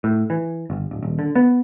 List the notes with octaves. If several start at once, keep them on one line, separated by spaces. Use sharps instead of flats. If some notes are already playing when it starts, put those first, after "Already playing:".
A2
E3
G1
D1
D#1
D3
B3